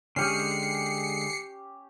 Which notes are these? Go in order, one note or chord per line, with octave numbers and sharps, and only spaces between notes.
D3 G#3 C#4 G4 G#4 C7 C#7